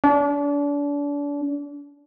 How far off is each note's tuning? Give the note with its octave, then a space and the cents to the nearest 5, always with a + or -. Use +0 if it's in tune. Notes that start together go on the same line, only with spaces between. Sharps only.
D4 -35